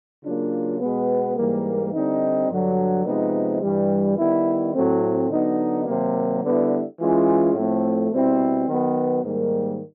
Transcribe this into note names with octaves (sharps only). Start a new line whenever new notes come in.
C#3 F#3 A#3 D4 F4
B2 G#3 B3
G#2 E3 G3 A#3
D3 G3 C4 D#4
G2 D3 F#3
C3 F3 G#3 B3 D#4
G2 E3 G3
D#3 G3 B3 E4
A2 F#3 A3 C4
D3 F#3 B3 D#4
C3 D#3 F#3 A#3
D3 G3 B3 E4
E3 G#3 C#4 F4
A2 F3 A3 C4
B2 G3 C4 E4
D#3 F#3 B3
G#2 D#3 G3 A#3